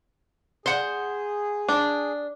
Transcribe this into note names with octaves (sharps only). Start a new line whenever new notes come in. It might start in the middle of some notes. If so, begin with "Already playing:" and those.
G#4 C5 F#5
D4